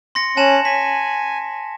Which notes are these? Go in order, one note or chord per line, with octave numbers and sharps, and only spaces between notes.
C6 A#6 C#7
C#4 G#5 A5 F#6 E7
G#5 B6